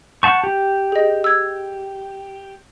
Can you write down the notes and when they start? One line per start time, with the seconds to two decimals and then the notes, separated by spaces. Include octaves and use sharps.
0.23 F#5 A5 C#6 G6
0.44 G4
0.92 G#4 D#5
1.24 E6 G#6